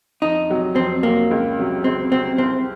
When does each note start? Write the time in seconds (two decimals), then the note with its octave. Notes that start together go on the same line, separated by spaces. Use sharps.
0.22 F2 D#4
0.50 C3 F#3
0.76 F2 C4
1.03 C3 F#3 A#3
1.31 C#2
1.58 C3 F#3
1.84 C#2 C4
2.12 C3 F#3 C4
2.38 C2 C4